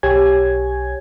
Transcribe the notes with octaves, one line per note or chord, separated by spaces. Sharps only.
B1 G4 C#5 G#5 G#6